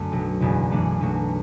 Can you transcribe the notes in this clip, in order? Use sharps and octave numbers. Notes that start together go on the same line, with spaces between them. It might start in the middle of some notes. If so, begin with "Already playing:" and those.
Already playing: F#2 D3 A3
B1 B2 F#3
F#1 E2 B2
F#2 E3 A3 D4
B1 B2 A3 F#4